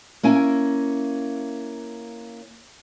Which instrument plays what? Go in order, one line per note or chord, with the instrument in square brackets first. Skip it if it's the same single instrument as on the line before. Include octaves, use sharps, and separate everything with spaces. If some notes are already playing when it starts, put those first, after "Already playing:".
[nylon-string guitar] A#3 C#4 E4 G#5